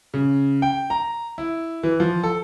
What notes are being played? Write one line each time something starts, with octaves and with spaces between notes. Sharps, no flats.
C#3
G5
A#5
E4
E3
F3
A4